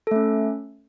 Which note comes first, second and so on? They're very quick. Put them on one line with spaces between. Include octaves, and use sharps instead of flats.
A4 A3 C#4